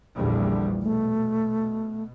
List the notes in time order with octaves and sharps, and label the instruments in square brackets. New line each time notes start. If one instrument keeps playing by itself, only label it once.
[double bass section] A#1 E2 G3 [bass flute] D3
[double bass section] B2 [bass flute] A3